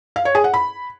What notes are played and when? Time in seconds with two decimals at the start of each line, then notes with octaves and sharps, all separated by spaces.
0.16 F5
0.25 C#5
0.35 G#4
0.44 F#5
0.54 B5